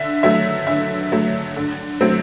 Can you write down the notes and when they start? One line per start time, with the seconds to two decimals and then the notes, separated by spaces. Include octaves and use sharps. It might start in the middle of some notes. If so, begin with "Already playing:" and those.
Already playing: D3 E5
0.23 F#3 A3 E5
0.67 D3 E5
1.12 F#3 A3
1.56 D3
2.01 F#3 A3 C4